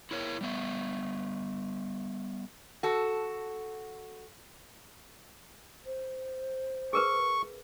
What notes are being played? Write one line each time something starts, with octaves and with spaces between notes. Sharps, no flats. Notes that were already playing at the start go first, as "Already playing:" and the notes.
E4 A#4 C#5
G3 B3 E5
F#4 A4
C5
G#4 A#4 B4 C#6